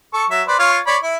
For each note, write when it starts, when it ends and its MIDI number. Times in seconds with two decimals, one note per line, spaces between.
0.14 0.24 69
0.14 0.24 85
0.31 0.42 54
0.31 0.42 76
0.48 0.57 71
0.48 0.57 72
0.48 0.57 74
0.59 0.78 65
0.59 0.78 73
0.59 0.78 77
0.87 0.96 73
0.87 0.96 74
0.87 0.96 83
1.03 1.17 64